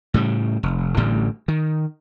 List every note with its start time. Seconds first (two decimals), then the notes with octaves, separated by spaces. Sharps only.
0.14 A2 C#3 G3
0.63 F1
0.97 A1 A2 D3 G3
1.48 D#3